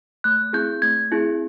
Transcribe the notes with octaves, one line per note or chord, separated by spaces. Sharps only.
A3 F#6
C4 E4 G#4 G6
A3 G#6
C4 E4 G#4